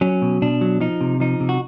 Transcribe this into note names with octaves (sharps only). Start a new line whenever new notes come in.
F#3 C#4
B2
B2 D4
F#3
F3 D#4
C3
F3 D#4
C3
F#4